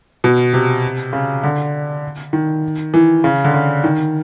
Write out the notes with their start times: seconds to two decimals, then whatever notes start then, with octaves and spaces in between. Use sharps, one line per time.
0.24 B2
0.53 C3
1.13 C#3
1.43 D3
2.33 D#3
2.94 E3
3.24 C#3
3.44 D3
3.54 C#3
3.84 D#3